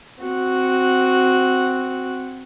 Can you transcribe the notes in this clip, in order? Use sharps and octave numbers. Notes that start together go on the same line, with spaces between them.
C4 F#4